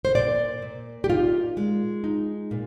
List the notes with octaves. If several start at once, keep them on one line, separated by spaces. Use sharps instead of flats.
C5
A#2 D5
A#2
G4
D#4 F4
G#3
D#4
A#2